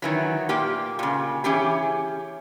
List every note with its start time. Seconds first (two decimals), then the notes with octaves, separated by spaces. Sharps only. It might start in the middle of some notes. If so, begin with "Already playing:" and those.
0.02 D#3 E3 F#3
0.49 A#2 A#3 G4
0.99 A#2 C#3
1.44 E3 C#4 G4 G#4